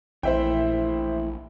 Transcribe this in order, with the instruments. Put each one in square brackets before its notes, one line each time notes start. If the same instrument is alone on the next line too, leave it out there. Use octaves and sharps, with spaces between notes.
[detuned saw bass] A#1 [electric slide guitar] E3 A3 E4 [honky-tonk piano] C5 E5 G5